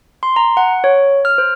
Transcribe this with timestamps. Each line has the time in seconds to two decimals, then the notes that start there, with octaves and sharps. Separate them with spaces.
0.23 C6
0.36 A#5
0.57 F#5
0.84 C#5
1.25 F6
1.38 C5